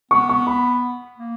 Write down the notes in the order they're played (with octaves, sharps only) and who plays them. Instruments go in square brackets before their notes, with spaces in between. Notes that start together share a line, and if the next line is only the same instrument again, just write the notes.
[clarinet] B3 [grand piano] C#6
[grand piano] C#6
B5
[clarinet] A#3